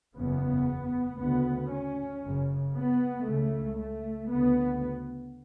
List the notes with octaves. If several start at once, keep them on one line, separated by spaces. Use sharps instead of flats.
F#1 E2 C#3 B3
D2 C#3 B3
C#4
F#1 F#2 C#3
B3
C#2 C#3 A3
A3
D2 C#3 B3